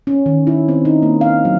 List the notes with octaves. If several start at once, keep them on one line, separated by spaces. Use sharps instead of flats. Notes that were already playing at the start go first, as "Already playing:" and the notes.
C#4
D#3
E4
C4
D#4
A#3
F5
F#3